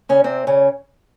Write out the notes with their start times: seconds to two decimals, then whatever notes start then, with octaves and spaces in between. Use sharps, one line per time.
0.09 C#3 C#4
0.24 C3 C4
0.47 C#3 C#4